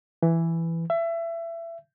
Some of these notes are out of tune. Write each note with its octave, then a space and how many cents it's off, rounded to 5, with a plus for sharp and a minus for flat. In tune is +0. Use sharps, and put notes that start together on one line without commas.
E3 +5
E5 +25